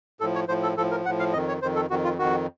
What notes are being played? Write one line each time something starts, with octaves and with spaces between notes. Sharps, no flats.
A2 F3 A4
C#5
A2 F3 C5
A4
A2 F3 A4
A#4
A2 F3 F#5
F5
F2 D#3 D#5
C#5
F2 D#3 C5
A4
F2 D#3 F#4
F4
F2 D#3 F#4